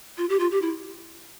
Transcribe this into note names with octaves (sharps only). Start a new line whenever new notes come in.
F4
G4
F4
G4
E4